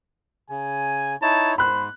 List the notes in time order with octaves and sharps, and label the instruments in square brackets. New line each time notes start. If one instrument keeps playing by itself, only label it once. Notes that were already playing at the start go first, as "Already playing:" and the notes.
[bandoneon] C#3 [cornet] G#5
[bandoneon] D#4 E4 C#5 [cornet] A5
[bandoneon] G#2 [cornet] C5 [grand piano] B5 F#6